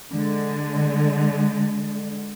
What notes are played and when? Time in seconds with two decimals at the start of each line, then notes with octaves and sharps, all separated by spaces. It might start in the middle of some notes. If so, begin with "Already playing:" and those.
0.12 D3 G#3